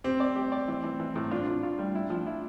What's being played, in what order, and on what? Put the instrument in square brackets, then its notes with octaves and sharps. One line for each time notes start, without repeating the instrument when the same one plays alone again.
[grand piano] C4 [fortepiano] G4
[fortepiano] D5
G4
D5
E3
E3
E3
A2
[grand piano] D4 [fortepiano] F4
[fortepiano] F4
F4
G3
E4
F3
E4